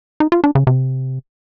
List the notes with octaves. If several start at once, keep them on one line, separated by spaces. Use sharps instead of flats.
D#4
F4
D4
C#3
C3